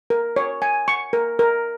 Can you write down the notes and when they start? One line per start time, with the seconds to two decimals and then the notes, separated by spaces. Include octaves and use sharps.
0.10 A#4
0.36 C#5
0.62 G#5
0.88 C#6
1.13 A#4
1.39 A#4